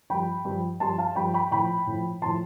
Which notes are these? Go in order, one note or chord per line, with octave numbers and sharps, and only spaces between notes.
G2 F3 G5 B5
G2 F3
G2 F3 A5 C6
F5 A5
G2 F3 G5 B5
G5 B5
A2 F3 G5 B5
A2 F3
A2 F3 A5 C6